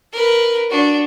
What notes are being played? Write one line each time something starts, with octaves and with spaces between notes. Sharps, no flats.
A#4 B4
D4 F#4